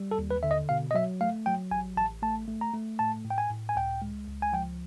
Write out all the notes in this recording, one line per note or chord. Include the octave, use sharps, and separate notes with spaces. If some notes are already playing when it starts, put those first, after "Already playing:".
Already playing: G3
A4
D#2
B4
D3 E5
D#5
B2 F5
D#5
F#3 E5
A3 F5
F#3 G5
A1 G#5
A1 A5
A3 A5
A3
A#5
A3
A2 A5
A2
G5
G#5
A2
G#5
C#2 G5
G#3
C#2
G#5
F3 G5